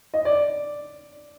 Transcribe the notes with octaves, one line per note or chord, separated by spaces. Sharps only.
D#5
D5